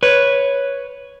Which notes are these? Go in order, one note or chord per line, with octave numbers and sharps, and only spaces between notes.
B4 C#5